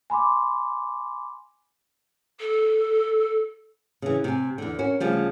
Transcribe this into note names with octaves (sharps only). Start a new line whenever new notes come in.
G#5 B5 C6 D6
A4
C#3 E3
C3 G#5
E2 D3
C#4 F#4 A#4
D2 C#3 F3 G3